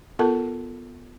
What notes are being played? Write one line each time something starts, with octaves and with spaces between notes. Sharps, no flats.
B3 F4 A4 A#4 A5